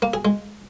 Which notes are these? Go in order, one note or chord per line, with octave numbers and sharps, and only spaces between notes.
A#3
G#4
G#3